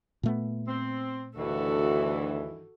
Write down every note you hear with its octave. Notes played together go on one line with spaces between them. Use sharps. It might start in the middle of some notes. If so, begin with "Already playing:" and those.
A#2 A3 B3
C4
D2 G2 D#3 E3 F#4 A4